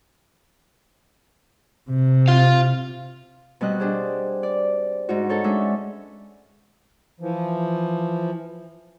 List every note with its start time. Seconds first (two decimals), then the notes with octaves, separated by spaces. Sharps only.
1.90 C3
2.28 F4 F5
3.61 B2 G3 C4 D#5 F#6
3.80 D4 G4 G#4 C5
4.43 D5
5.09 G#2 D#4 F#4
5.29 D#4 A4 C#5
5.44 G#3 C#4 D4 E5
7.20 E3 F3